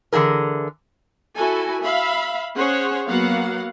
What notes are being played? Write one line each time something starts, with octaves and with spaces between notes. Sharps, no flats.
D3 E3 G#4 A#4
E4 F#4 A4 G#5
E5 F5 B5
C#4 G#4 C5 C#5 F#5
F#3 A#3 B3 F5 F#5